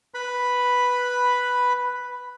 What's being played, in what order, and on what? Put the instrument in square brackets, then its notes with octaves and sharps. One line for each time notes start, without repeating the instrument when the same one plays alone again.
[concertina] B4 B5